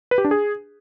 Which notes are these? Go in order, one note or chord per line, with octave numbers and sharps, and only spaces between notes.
B4
G4
D4
G#4